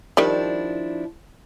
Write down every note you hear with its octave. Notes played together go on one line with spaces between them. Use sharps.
D#3 F3 G3 D4 E4